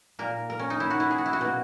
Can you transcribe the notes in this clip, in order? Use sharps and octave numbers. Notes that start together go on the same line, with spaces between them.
A#2 A#3 A#4
A#4
C#4
D#4
E4
F#4
E4
G#4
F#4
E4
F#4
B2 A#3